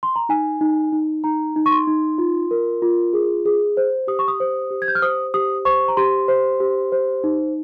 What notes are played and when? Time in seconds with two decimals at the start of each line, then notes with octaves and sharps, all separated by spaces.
0.03 C6
0.16 A#5
0.29 D#4 G#5
0.61 D#4
0.92 D#4
1.24 D#4 A#5
1.56 D#4
1.66 C#6
1.71 C6
1.87 D#4
2.18 F4
2.51 A#4
2.82 F4
3.13 G#4
3.45 G#4
3.77 C5
4.08 G4 D#6
4.19 C#6
4.28 D#6
4.40 C5
4.71 G4
4.82 G#6
4.88 G6
4.95 F6
5.02 C5 D#6
5.34 G4 D#6
5.65 C5 C#6
5.88 A#5
5.97 G4 C6
6.28 C5
6.60 G4
6.92 C5
7.24 D#4